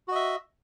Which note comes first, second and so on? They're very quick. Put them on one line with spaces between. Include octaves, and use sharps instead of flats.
F#4 D#5 E5